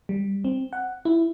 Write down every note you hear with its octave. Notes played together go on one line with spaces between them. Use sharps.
G3
C4
F#5
E4